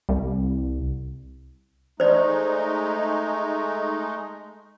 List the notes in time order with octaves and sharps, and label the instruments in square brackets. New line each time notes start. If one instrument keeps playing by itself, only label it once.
[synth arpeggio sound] C2
[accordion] G#3 A3 D#4 [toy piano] C5 D5